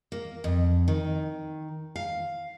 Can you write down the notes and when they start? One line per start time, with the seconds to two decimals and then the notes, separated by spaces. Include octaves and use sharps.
0.12 A#3
0.44 F2
0.88 D#3
1.96 F5